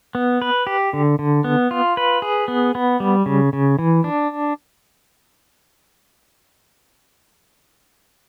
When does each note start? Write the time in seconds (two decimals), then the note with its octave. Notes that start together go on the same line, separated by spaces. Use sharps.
0.15 B3
0.42 B4
0.67 G4
0.93 D3
1.19 D3
1.44 B3
1.71 F4
1.97 B4
2.22 G#4
2.48 B3
2.75 B3
3.00 G3
3.26 C#3
3.53 C#3
3.79 E3
4.04 D4